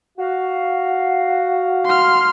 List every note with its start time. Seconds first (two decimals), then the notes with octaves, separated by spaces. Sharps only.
0.18 F#4 F5
1.85 C6 F6